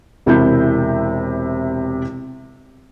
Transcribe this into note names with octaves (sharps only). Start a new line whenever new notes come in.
E1 C3 E4 E5 G6